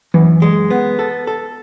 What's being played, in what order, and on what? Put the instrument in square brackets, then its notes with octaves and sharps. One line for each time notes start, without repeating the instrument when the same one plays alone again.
[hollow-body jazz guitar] F#2 [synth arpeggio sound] E3
[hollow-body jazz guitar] G#3
B3
A4
A4